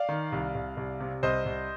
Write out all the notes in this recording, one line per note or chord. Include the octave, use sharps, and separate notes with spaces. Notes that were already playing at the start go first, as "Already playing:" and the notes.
Already playing: D5 F5
D#3
C2
C2
C2
C3
C2 C5 D#5
C2